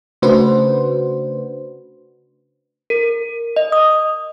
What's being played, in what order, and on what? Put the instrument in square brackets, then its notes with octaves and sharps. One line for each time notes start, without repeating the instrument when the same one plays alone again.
[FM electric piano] C#3 A3 D4 F#4 B4 C5
[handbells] A#4
D#5
D#6